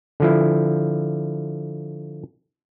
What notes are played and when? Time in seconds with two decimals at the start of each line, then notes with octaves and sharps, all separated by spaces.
0.20 D3 F3 E4